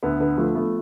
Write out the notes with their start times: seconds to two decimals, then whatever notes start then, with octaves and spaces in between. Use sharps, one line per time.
0.03 D2 B3
0.20 D3 B3
0.37 F3 A3
0.55 A3 B3